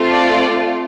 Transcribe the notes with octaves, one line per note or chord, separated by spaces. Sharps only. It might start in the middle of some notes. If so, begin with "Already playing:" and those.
Already playing: A3 C4 F4 A4
D5